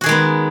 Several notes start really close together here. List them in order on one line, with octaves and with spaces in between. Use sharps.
F#4 G#4 D#3 G#3 B3